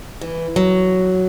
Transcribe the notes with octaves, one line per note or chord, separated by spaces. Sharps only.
E3
F#3